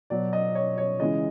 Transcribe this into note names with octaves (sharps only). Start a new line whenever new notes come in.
B2 F#3 D5
D#5
C#5
C#5
C#3 E3 G#3 D#5